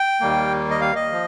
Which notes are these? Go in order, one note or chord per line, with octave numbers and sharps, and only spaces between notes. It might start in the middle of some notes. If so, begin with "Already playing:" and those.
Already playing: G5
D#2 D#3 G3 A#3
D#5
F5
D#5
F3